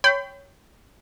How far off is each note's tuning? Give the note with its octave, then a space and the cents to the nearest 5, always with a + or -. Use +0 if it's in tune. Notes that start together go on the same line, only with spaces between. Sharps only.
C#5 +5 G5 +0 B5 +45